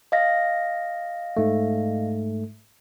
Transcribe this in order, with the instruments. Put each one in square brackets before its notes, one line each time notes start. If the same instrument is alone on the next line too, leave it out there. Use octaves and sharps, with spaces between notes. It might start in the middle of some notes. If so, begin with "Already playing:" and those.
[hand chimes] D#5 F5 A#6
[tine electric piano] G#2 A3